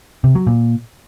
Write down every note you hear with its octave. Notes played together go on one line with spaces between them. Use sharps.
C3
F#3
A#2